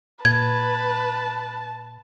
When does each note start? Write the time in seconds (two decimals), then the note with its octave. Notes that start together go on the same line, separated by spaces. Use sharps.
0.25 A#2 B4 A5 G#6